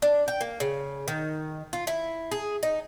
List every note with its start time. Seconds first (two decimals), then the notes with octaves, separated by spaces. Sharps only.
0.02 D4
0.28 G5
0.41 A#3
0.60 C#3
1.08 D#3
1.73 F4
1.87 E4
2.31 G#4
2.63 D#4